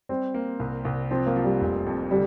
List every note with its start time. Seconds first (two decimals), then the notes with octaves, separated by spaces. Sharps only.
0.09 G3 C4
0.34 A#3
0.59 C2
0.85 C2
1.11 F3 C4
1.27 A#3
1.36 F3
1.44 G3
1.61 F1
1.86 F2
2.11 D3 G3